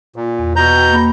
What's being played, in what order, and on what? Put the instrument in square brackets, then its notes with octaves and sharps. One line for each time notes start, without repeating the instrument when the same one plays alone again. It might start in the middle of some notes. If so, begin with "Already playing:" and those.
[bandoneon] A#2
[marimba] E2
[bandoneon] B2 A#5 G6
[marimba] G5
A#3 B5